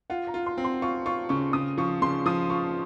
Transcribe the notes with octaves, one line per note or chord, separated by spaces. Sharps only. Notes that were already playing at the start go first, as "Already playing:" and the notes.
F4 F#5
A#5
F4
C6
C4
C6
F4 C#6
F4 C#6
C#3 C#6
C#3 D#6
F3 C#6
C#3 C6
F3 D#6
F4 C#6